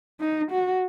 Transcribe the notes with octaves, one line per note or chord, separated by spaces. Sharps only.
D#4
F#4